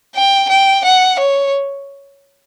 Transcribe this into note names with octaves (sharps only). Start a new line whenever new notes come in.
G5
G5
F#5
C#5